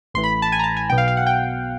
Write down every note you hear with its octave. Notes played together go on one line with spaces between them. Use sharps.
A1 A2 E3 C6
B5
A5
G#5
A#5
A5
G#5
B1 B2 G5
F5
F5
F#5
G5